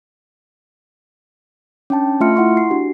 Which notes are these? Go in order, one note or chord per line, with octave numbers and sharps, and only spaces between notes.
C#4 D4 G5 A5
A3 F4 E5 C6 F6 C#7
E4 F#5 C6 C#6
C7
D4 F#4 G4